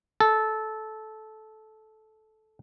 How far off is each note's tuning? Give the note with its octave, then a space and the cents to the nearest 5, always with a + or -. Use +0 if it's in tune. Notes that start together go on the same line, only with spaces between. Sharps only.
A4 -15